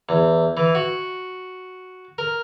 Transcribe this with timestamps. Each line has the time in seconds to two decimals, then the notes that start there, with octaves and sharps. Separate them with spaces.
0.09 E2
0.57 E3
0.75 F#4
2.18 A#4